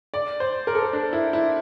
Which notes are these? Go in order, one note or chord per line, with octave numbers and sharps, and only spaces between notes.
D5
C5
A#4
A4
A#4
D4
E4
E4